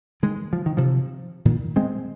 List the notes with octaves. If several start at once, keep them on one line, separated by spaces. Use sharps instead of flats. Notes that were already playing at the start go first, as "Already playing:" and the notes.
D#3 G#3
F3
D#3
C3 F3
A#2 D#3
G#3 C4